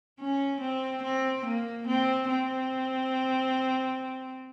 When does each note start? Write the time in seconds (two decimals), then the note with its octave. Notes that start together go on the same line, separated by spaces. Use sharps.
0.20 C#4
0.61 C4
1.03 C4
1.45 A#3
1.87 C4
2.28 C4